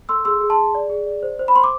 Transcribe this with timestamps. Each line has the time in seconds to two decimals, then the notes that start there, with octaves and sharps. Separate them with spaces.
0.09 A4 C6 E6
0.25 G#4 C6 E6
0.41 G#4
0.50 A5 C6
0.58 G#4
0.75 D5
0.90 G#4
1.06 D5
1.23 C5
1.39 C5
1.48 B5
1.55 C5 C6
1.64 D6